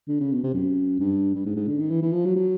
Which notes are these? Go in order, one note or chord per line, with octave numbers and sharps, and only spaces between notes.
D3
C#3
B2
C3
F#2
G2
G2
G#2
G#2
D3
D#3
E3
E3
F3
F#3
F#3